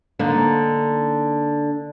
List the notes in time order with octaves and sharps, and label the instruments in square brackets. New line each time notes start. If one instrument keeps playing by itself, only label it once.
[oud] D3 A#3 D#4